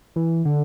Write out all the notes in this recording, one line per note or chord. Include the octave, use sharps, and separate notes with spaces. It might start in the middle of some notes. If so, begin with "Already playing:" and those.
E3
D3